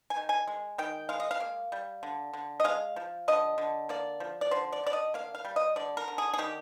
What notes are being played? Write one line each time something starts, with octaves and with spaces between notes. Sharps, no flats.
G#5
D#3
G#5
G#3
D#3 G5
G#3 F5
D#5
F5
A#3
G3
D3
D3
D#5
G#3 F5
F3
D3 D#5
D3
A#3 D5
F3
D5
D3 C5
D5
D3 D5
D#5
A#3 F5
F5
G3
D#5
D3 D5
A#4
D3
G#4
G#4
D#3 G4